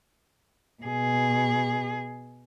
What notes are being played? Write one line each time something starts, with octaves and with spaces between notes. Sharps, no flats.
B2 G#4